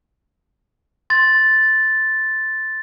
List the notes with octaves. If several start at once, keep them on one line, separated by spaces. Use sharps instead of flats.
C6 A6